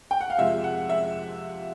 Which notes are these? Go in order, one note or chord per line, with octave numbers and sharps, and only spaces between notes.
G5
F#5
F5
F2 C3 F3 G#3 E5
F#5
E5